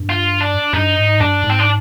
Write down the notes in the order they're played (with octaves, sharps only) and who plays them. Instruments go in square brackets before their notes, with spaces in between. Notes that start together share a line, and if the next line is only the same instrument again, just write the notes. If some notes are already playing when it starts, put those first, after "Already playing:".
Already playing: [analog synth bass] G2
[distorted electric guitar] F4
D4
[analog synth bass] G2 [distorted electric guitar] D#4
[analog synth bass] G#2
[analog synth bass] G2 [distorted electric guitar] D4
[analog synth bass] G#2
[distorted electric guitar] C4
D4